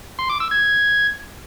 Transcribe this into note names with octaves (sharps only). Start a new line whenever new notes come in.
C6
D6
E6
G#6